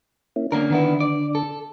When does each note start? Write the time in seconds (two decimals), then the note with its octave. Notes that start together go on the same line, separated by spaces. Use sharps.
0.36 A#3 C#4 E4
0.52 D3 A#3 C#4 D4 A#4
0.70 D#3 B3 E4
1.00 D5
1.35 A4